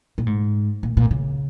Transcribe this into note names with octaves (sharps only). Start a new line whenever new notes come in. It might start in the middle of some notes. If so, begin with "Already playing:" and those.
A#2
G#2
A#2
A#2
C#3